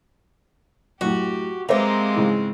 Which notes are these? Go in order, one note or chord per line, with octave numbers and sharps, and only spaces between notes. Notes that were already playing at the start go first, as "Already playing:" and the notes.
F#2 A2 F#4 G4
G#3 A#3 C4 G4 B4 C5 E5
G#2 C#3 E3